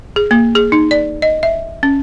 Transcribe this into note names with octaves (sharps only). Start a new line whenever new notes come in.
G#4
A#3
G#4
D#4
D5
D#5
E5
C#4